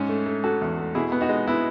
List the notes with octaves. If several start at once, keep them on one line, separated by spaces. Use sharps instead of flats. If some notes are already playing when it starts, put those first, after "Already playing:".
Already playing: G#2 C#4
A3
A3
A3 F#4 A4
E2
A3
B2 E4 G#4
B3
D#4 F#4
G#3
B3 E4